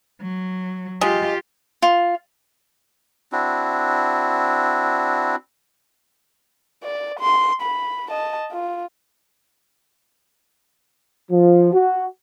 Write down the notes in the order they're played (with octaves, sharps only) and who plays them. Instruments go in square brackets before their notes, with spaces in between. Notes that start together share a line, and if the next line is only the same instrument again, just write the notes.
[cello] F#3
[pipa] G#3 [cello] F4 G4
[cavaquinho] F4
[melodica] C4 D4 E4 F#4
[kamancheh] D5
C6
B5
D#5 A5
F4
[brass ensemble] F3
F#4